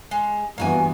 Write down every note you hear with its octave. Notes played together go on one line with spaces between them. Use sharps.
G#3
G2 E3 A#3 B3 F#4 G#5